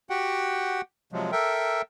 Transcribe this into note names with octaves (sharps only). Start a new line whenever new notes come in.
F#4 G4 F#5 G5
C3 F3 F#3 G#3
A4 A#4 E5 G5